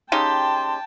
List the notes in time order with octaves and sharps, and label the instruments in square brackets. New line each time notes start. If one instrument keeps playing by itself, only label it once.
[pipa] C#3 D#4 G4 [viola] G5 A5 [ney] C6